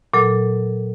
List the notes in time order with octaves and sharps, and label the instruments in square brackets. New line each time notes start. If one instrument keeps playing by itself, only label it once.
[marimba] A#2 F#3 A4